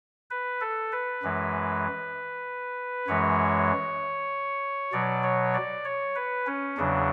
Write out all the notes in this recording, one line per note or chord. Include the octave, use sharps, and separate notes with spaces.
B4
A4
B4
F#2 E3 G#3
F#2 E3 G#3 C#5
B2 F#3 D5
C#5
D5
C#5
B4
C#4
E2 C#3 F#3 D4